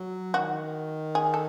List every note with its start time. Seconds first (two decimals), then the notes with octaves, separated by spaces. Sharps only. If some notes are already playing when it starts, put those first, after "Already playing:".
Already playing: F#3
0.34 D#3 F#4
1.15 G#4
1.34 A4